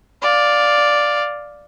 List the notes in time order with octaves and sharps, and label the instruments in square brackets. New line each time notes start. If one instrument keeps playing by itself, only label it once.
[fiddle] D5 F5